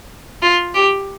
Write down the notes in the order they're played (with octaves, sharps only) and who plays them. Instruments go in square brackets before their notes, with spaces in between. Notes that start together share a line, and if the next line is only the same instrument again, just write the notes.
[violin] F4
G4